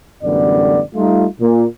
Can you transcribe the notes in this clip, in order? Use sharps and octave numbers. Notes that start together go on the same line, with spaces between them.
A1 F#2 D3 G3 B3 D5
G3 A3 D#4 F4
A#2